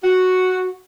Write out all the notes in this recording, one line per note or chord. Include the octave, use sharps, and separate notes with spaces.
F#4